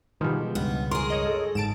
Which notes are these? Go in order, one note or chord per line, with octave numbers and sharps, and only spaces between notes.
B2 D#3 F3 G3 G#3
C#2 G2 B3
G#4 A#4 C6
C#5 D#5
A4
G1 G#2 A5 D7 E7